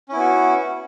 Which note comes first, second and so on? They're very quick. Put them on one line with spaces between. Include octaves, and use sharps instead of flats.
C#4 E4 B3 F#4